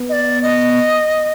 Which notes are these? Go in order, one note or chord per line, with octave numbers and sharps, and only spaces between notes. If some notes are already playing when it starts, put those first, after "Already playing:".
Already playing: B3
D#5
D5
D#5